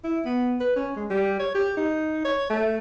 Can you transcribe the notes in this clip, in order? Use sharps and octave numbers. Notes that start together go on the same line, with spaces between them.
E4
B3
B4
C#4
G#3
G3
C#5
G4
D#4
C#5
A3